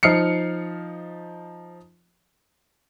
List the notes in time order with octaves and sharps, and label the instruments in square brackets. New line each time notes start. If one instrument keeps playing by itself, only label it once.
[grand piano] F3 D#4 F6 C7 C#7